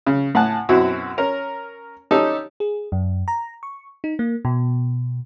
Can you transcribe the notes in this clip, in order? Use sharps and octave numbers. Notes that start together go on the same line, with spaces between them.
C#3
A2 F#5 G#5 A5 F#6
F#2 B2 C4 E4 F#4
C#4 A#4
C#4 D#4 G4 A4
G#4
F#2
A#5
C#6
D#4
A#3
B2